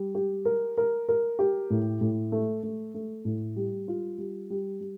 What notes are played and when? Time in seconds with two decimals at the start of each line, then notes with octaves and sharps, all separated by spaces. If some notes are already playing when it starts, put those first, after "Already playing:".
Already playing: G3
0.15 G4
0.45 A#4
0.77 A#4
1.09 A#4
1.39 G4
1.70 A2
2.01 A2
2.32 A3
2.63 A3
2.94 A3
3.25 A2
3.56 G3
3.88 F4
4.18 G3
4.50 G3
4.81 G3